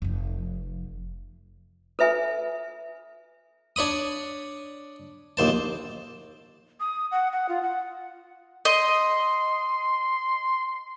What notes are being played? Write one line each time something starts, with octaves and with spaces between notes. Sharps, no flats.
F1 F3
A4 B4 E5 G#5
D4 C#5 B5 D#6
A#1 D#2 C5 A5
D#6
F#5
F#5
F4
F#5
D#5 C6